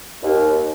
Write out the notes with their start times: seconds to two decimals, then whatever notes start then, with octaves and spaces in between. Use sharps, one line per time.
0.23 D#2